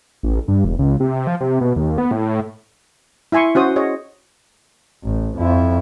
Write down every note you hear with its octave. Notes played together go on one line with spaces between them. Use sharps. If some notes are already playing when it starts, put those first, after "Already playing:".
A1
G2
E1
C#2
C3
F3
C3
B2
D#2
B3
A2
E4 E5 G#5 C6 C#6
C#4 F#4 C5 D#6
G#4 C#5 D#5
A1
F2 E4